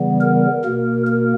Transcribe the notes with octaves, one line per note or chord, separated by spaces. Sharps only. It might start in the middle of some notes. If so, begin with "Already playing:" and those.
Already playing: C#3 E3 G3 B3
A#4
B2 A#3
A#4